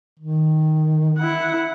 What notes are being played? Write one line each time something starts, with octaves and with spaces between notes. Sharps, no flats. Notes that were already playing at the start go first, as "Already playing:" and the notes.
D#3
E4 F#5